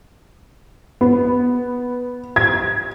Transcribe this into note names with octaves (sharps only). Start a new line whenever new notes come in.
B3
G#6